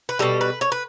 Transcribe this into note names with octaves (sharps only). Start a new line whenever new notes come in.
B4
B2 G3 A4
B4
C#5
B4